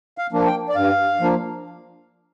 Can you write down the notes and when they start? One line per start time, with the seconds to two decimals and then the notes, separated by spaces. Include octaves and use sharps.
0.18 F5
0.32 F3 A#3 D4
0.46 G5
0.69 D5
0.75 G2 F5
1.20 F3 A#3 D4